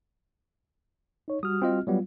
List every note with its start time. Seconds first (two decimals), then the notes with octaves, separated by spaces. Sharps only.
1.28 D#4 C#5
1.43 G3 F#4 D#6 F6
1.62 C4 F4 D#5
1.87 F#3 G3 B3 F4